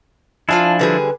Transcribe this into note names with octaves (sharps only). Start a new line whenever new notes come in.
F3 D4 E4 F4 F5 G#5 A5
D3 G3 G#4 B4